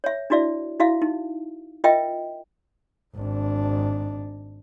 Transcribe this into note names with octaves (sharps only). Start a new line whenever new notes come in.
C#5 E5
D4 E4 F#4 D5 E5
E4 F#4 E5 F5
D#4
F4 A#4 D#5 E5 G5
G#1 D4